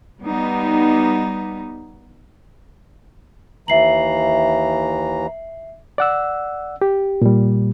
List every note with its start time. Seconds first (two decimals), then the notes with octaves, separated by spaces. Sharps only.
0.21 G3 B3 D#4
3.68 D#2 E3 E5 A#5 C7 F#7
5.98 D5 F#5 E6
6.82 G4
7.22 A#2 G3